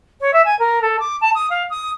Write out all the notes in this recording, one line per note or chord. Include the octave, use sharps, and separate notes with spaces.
C#5
E5
G#5
A#4
A4
D6
A5
D#6
F5
D#6